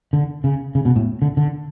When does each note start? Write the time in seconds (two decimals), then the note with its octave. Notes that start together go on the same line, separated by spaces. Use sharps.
0.13 D3
0.44 C#3
0.75 C#3
0.85 B2
0.96 A2
1.22 D3
1.37 D3